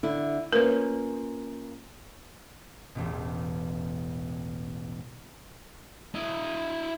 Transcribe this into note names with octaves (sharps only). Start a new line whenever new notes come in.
D3 E4
A#3 C#4 F4 A#4 B4
E1 A1 B2
E4 D#5